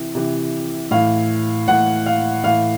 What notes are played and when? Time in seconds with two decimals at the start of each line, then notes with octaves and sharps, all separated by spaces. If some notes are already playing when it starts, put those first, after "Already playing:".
Already playing: C3 E3
0.15 C3 E3
0.91 A2 E3 F5
1.68 A2 E3 F#5
2.06 F5
2.43 A2 E3 F5